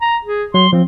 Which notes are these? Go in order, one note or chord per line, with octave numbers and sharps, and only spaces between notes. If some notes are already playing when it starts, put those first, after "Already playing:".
A#5
G#4
F#3 C6
F3 C4